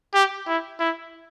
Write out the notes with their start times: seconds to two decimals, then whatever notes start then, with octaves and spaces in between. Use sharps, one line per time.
0.14 G4
0.47 E4
0.80 E4